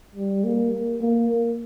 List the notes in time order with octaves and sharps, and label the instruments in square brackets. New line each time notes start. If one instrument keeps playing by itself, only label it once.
[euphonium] G3
A#3
A#3